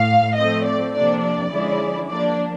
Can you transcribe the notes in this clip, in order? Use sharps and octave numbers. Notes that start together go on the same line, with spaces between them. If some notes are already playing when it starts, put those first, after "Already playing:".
Already playing: A2 F5
F3 A3 C4 D#5
D5
C3 F3 A#3 D4 D5
D5
D3 F3 G#3 C#4 E4
F3 A#3 D4 D5